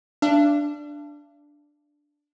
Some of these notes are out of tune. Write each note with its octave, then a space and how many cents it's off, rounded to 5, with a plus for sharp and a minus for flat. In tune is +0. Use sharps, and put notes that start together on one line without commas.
D4 +0 F5 -45